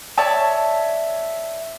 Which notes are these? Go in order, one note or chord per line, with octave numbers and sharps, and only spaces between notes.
C#5 D5 E5 A5